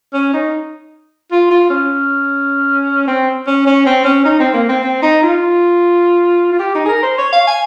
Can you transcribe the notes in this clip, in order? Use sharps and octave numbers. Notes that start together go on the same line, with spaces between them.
C#4
D#4
F4
F4
C#4
C4
C#4
C#4
C4
C#4
D#4
C4
A#3
C4
C4
D#4
F4
F4
G4
D#4
G#4
A#4
C5
C#5
F5
G#5